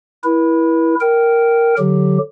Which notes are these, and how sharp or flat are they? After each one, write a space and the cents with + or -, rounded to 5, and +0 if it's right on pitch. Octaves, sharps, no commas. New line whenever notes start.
E4 +0 B4 -45
A#4 +0 G5 -15
D3 +0 F#3 +0 G4 +0